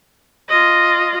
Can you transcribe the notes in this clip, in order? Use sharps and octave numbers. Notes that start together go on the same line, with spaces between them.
F4 D#5